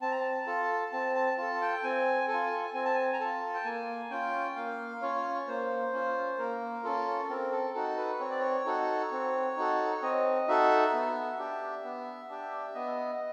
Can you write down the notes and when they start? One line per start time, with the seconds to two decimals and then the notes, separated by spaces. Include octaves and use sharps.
0.01 C4 A5
0.11 A#5
0.20 A5
0.47 F4 A4
0.92 C4 A5
1.15 A5
1.37 F4 A4 A5
1.61 G5
1.83 C4 G#5
2.28 F4 A4 G#5
2.74 C4 G#5
2.85 A5
2.94 G#5
3.13 A#5
3.20 F4 A4 A5
3.54 G5
3.65 A#3 G#5
4.11 C#4 F4 G5
4.56 A#3 F5
5.02 C#4 F4 C#5
5.48 A#3 C5
5.93 C#4 F4
6.38 A#3 A#4
6.84 C#4 F4 A4
7.29 C4 A#4
7.52 A4
7.74 D#4 F#4 A4
7.97 B4
8.20 C4 C#5
8.30 D5
8.40 C#5
8.65 D#4 F#4 A4
9.12 C4
9.57 D#4 F#4 A4
10.02 C4 D#5
10.48 D#4 F#4 A4 E5
10.93 B3
11.38 D4 G4
11.84 B3
12.29 D4 G4
12.74 B3 D#5